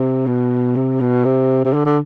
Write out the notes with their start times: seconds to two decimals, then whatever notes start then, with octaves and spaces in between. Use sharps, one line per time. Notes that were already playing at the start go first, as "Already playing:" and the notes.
Already playing: C3
0.27 B2
0.76 C3
1.00 B2
1.25 C3
1.65 C3
1.73 D3
1.86 D3